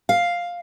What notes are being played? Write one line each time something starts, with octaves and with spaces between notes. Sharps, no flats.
F5